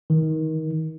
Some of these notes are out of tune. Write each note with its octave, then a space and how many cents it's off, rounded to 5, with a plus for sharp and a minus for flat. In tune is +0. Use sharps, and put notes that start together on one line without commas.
D#3 +25